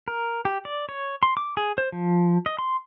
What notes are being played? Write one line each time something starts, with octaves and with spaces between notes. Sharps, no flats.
A#4
G4
D5
C#5
C6
D6
G#4
C5
F3
D#5
C6